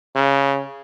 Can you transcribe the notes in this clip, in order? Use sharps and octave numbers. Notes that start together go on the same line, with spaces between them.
C#3